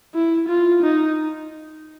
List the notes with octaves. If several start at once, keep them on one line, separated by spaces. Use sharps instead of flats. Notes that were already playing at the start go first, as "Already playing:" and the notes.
E4
F4
D#4